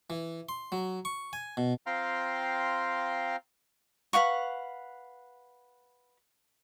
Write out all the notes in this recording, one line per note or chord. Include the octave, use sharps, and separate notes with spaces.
E3
C6
F#3
C#6
G#5
B2
C4 F4 F5 G5 A#5 C6
B4 F5 F#5 C#6